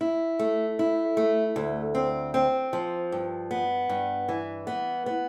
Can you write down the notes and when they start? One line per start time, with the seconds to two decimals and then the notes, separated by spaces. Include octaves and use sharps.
0.01 E4
0.39 A3
0.79 E4
1.17 A3
1.56 D2
1.95 C4
2.34 C4
2.73 F3
3.12 G2
3.51 B3
3.89 G2
4.29 E3
4.67 B3
5.06 B3